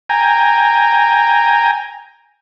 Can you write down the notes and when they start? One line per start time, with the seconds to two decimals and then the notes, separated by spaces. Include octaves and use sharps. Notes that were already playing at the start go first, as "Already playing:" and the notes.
0.09 G5 G#5 A#5